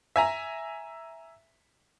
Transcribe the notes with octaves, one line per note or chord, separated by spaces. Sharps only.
E5 G#5 A#5